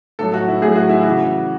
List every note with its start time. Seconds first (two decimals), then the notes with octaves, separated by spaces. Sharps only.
0.19 A2 F#3 A4
0.34 F#4
0.48 E4
0.62 A2 F#3 G#4
0.75 F#4
0.89 E4
1.03 C#3 E3 F#4